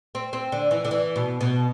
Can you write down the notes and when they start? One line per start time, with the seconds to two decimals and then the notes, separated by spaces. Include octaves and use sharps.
0.15 C4
0.33 C4
0.52 D3
0.71 E3
0.85 D3
0.91 E3
1.16 B2
1.41 B2